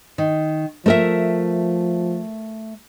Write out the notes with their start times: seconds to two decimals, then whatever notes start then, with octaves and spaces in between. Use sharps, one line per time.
0.18 D#3
0.86 F3 A3 A#4 E5